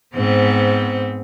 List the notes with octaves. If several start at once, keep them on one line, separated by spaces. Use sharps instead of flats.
G#2 B3 C4